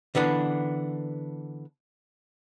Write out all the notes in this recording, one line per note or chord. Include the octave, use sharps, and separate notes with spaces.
D3 E3 B3 D4